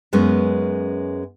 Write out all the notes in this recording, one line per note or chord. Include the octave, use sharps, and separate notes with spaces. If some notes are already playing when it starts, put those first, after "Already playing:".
F#2 G#3 B3 C#4